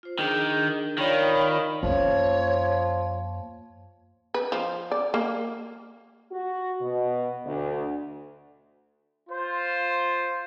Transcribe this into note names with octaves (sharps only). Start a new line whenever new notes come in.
F4 C5
D#3 D4 G#4
D#3 F4 C#5 D5 F5 G5 B5
F#2 F3 A#3 C#5
B4
F3
D5
A#3
F#4
B2
D2
F4 C5